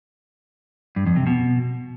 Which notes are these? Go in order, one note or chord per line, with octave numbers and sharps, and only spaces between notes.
G2
F2
C3
B2